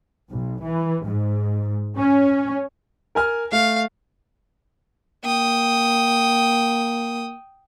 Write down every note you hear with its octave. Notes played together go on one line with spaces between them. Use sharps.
B1
E3
G#2
C#4
A#4 G#5 F6
A3 F5
A#3 G5 D#6